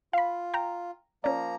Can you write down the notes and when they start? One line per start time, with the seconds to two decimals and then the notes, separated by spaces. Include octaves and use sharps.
0.13 F4 F5 B5
0.54 G5 A#5
1.24 F3 A#3 C#4 D5 A#5